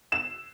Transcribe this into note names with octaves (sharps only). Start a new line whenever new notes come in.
E7